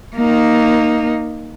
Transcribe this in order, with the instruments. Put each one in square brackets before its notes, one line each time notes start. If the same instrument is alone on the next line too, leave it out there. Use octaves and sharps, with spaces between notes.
[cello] A#3 D#4